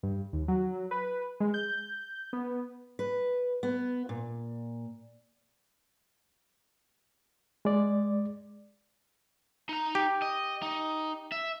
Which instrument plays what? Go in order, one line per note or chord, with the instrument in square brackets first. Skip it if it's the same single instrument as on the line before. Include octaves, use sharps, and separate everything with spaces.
[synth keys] G2
D#2
F#3
B4
G#3
G6
B3
[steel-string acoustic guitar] B4
B3
A#2
[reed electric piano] G#3 D5
[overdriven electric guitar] D#4 A#5
[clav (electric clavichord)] G4
[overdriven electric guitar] D#5
D#4
E5